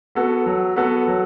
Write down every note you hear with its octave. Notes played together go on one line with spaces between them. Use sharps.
B3 F#4 A4
F#3
B3 F#4 A4
F#3